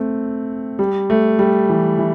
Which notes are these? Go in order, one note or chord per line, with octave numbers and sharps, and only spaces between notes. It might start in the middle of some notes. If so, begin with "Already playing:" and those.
Already playing: A3 C4
G3
A3
G3
E3
E3